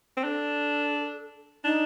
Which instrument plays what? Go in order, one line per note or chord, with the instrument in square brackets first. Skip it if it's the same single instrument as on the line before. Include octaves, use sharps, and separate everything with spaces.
[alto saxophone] C4
[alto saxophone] D4 [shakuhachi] A4
[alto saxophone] D4 [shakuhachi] D#4